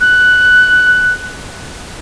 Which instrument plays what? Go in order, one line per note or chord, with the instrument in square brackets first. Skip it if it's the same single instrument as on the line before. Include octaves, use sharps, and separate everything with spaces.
[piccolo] F#6